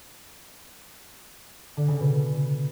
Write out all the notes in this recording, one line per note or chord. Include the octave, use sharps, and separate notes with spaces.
D3
C#3
B2